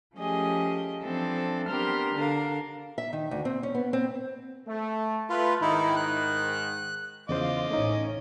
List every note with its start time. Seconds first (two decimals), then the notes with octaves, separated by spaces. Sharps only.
0.15 F3 A3 C#4 G4 G#4 D#5
1.04 E3 F3 C4 D4 A4
1.68 B3 D4 G4 A#4 C6 F6
2.15 D3 D4 A#4 F5
2.98 E5
3.13 D#3
3.31 D2
3.45 C4
3.63 C#4
3.75 B3
3.93 C4
4.67 A3
5.30 A3 F4 B4
5.62 G#2 D#3 D#4 E4
5.96 F#6
7.29 E2 C#3 F4 C5 D#5 D6
7.70 A1 A3 C#4 D#4